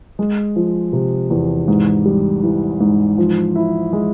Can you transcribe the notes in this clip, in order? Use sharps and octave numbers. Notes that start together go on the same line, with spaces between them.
G#3
F3
C3
E2
G#2
G3
E3
G#2
F3
E4
G#3